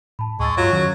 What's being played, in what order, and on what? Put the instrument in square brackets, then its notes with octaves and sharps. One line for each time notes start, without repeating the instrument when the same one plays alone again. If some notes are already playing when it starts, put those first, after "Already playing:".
[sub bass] A2 [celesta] A5 B5
[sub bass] D2 [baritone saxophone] G#3 [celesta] C#6 E6 A6
[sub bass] G2 [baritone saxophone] F#3 [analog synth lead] F4
[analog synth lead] F#2 [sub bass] D#3